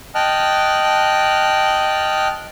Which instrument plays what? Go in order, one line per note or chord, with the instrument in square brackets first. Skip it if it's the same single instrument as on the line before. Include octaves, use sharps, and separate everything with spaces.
[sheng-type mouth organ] D#5 G5 A5 F6 F#6